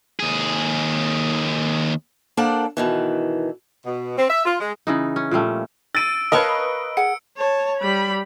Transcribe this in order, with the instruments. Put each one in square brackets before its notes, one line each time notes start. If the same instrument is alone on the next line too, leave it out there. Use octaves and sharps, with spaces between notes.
[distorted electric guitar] D#2 G#4
[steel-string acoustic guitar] A#3 D4 A4 C5 D5 F#5
B2 D#3 E3
[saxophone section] B2
C4
E5
F4
G#3
[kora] C#3 E3 D#4
C#4
A#2 F3 G3 A3
[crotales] E6 D7 [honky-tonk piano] A6 D#7
[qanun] A#4 F5 C#6 [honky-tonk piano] B4 D#5 [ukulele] C#5 A5 B5
[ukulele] G#4 F#5 [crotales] C#7
[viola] C#5 A5
G3 B5